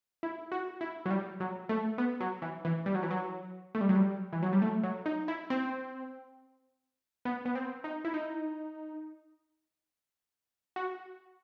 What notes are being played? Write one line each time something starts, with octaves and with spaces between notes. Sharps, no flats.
E4
F#4
E4
F#3
G3
F#3
A3
B3
F#3
E3
E3
G3
F#3
E3
F#3
A3
G3
F#3
G3
E3
F#3
G3
A3
F#3
D#4
E4
C4
B3
B3
C4
D#4
E4
D#4
F#4